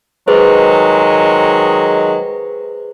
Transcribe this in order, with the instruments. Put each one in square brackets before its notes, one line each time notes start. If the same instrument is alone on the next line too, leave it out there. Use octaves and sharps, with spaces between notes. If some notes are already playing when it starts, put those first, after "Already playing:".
[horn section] D#3 F#3 G#3 [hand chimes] G#4 B4 C5